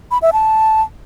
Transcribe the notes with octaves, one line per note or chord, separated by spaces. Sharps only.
B5
E5
A5